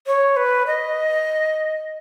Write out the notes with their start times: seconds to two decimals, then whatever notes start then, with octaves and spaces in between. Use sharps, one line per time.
0.07 C#5
0.36 B4
0.67 D#5